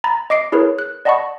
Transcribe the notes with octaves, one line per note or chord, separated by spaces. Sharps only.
A#5 B5 A6
D#5 D6 C7 D7
E4 G#4 A#4 B4 C#5
F#6
D5 D#5 F#5 A5 B5 C#6